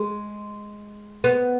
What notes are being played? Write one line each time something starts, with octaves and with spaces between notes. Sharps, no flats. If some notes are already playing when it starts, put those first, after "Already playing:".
Already playing: G#3
B3